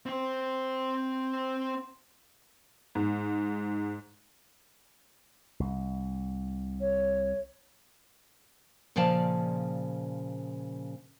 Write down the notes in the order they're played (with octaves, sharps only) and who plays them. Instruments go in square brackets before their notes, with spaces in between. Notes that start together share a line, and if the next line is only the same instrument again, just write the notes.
[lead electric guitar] C4 C5
[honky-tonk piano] G#2
[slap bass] C2
[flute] C#5
[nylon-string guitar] A#2 C#3 F3 D5 F5 A5